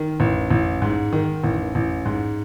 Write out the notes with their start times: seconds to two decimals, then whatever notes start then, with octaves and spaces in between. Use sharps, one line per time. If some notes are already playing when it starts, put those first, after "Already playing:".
Already playing: D#3
0.20 A1
0.50 A1
0.82 G#2
1.13 D#3
1.44 A1
1.75 A1
2.06 G#2